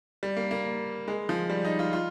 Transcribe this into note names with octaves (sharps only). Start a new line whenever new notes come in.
G3
A#3
A#3
G#3
F3
G3
D#4
F4
F4